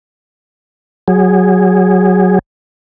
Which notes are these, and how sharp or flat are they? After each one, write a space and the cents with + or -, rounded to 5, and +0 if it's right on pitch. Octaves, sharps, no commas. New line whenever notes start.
F#3 +0 G#4 -15